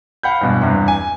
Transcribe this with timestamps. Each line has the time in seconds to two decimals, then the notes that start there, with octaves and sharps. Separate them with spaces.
0.23 F5 F#5 B5 G6
0.41 E2 G2 B2
0.61 E2 G2 C3
0.88 G#5